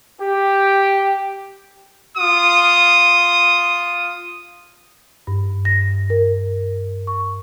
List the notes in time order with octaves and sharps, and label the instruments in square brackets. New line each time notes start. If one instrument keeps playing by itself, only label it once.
[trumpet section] G4
F4 D#6
[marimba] G2
A#6
A#4
C#6